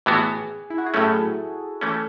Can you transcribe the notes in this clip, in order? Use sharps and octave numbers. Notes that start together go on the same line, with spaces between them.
A2 E3 B3 F#4 G#4
E4
F#4
G#4
A2 F#3 A3 C#4 A4
E3 A3 C#4 A4